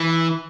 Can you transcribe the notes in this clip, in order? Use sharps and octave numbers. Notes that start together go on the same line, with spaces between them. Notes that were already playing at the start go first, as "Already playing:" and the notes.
Already playing: E3